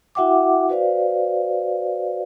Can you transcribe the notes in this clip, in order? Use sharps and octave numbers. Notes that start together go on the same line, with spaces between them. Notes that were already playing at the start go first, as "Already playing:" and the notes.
E4 F#4 E5 F#5 G5 D6
F#4 B4 C5 D5 F5